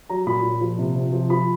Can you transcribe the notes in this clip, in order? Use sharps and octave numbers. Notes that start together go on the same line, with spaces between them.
F#3 A#5
A#2 B5
A#2
F3
C3
C3
F3
F3 B5